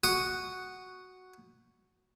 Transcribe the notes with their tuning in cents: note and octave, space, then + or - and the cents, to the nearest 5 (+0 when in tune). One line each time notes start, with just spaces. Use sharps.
F#4 +0 D#6 -15